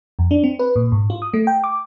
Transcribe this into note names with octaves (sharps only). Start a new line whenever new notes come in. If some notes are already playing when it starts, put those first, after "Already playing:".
F2
D4
C4
B4
A#2
G#2
F4
D#6
A3
G5
D6